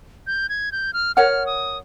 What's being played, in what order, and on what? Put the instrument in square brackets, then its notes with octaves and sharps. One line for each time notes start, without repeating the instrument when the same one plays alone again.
[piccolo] G6
G#6
G6
F6
[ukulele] A#4 C#5 F#5 [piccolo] F6
[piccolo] D#6